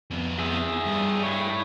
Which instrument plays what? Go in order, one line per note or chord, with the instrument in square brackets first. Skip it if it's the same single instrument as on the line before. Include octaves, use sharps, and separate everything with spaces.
[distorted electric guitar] F2 B3
[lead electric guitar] G#4 E5
[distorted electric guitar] G2
[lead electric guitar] E4 C#5